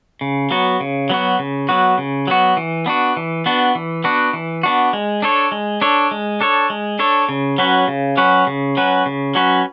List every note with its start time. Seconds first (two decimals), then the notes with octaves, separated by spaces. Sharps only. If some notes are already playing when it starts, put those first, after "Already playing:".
0.21 C#3
0.51 F#3 B3 F#4
0.80 C#3
1.10 F#3 B3 F#4
1.39 C#3
1.69 F#3 B3 F#4
1.98 C#3
2.27 F#3 B3 F#4
2.57 E3
2.86 B3 D4 F#4
3.17 E3
3.46 B3 D4 F#4
3.75 E3
4.04 B3 D4 F#4
4.33 E3
4.63 B3 D4 F#4
4.93 G#3
5.22 D4 A4 C#5
5.52 G#3
5.82 D4 A4 C#5
6.11 G#3
6.41 D4 A4 C#5
6.70 G#3
6.99 D4 A4 C#5
7.29 C#3
7.58 F#3 C#4 F#4 B4
7.88 C#3
8.17 F#3 C#4 F#4 B4
8.47 C#3
8.77 F#3 C#4 F#4 B4
9.06 C#3
9.35 F#3 C#4 F#4 B4